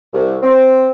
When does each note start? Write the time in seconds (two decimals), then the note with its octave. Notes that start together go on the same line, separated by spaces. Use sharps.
0.13 C2
0.42 C4